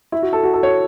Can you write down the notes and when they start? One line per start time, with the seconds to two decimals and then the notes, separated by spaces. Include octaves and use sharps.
0.12 E4
0.22 F#4
0.33 A4
0.43 F#4
0.54 A4
0.63 C#5